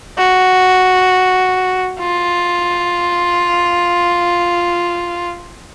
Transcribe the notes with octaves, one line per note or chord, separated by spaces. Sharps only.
F#4
F4